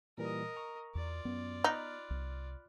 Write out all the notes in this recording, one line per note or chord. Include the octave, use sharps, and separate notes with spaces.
A#2 E3 G3 A#4 D#5
A#5 C#6
E2 F4 D5
F#2 B3
D#4 B5 F6 F#6
C2